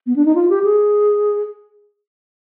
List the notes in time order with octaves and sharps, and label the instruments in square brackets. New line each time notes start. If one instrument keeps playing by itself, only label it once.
[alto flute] B3
D4
D#4
F4
G4
G#4